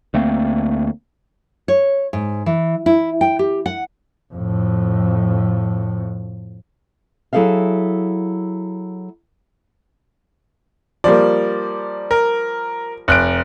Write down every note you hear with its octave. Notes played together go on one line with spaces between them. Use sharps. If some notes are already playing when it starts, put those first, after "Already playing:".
D2 A3 A#3 C4
C#5
G#2
E3
E4
G5
G4
F#5
F2 A2
F#3 E4 G#4 A4 E5 F5
F3 G3 A#3 D5
A#4
F1 F#6 D7